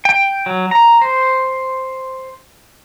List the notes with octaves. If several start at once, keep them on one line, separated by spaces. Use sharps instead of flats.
G5
F#3
A#5
C5